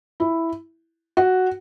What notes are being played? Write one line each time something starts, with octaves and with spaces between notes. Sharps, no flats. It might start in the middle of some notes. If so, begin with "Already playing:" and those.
E4
F#4